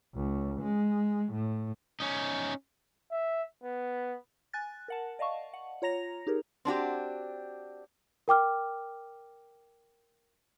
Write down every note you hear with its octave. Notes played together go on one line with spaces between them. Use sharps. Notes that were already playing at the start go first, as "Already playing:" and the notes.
C#2
G#3
A2
C#4 D#4
E5
B3
G#5 F#6 A6
A#4 F#5 A5
D5 D#5 F5 A5 C#6
F#5
F4 C#5 A#5 A#6 F7
D#4 G4 G#4 A#4
C4 D4 F#4 G4
A#4 G5 D6 F6